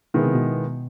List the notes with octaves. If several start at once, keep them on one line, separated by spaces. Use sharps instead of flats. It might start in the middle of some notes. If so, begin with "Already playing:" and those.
B2 D#3 G#3 B3 E4
C3
B2